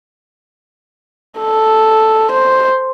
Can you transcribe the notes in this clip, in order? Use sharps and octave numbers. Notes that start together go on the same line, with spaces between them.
A4
C5